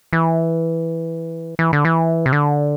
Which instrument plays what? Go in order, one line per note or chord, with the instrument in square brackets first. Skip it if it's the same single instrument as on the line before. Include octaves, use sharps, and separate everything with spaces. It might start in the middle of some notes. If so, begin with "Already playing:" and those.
[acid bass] E3
E3
D3
E3
C3
D3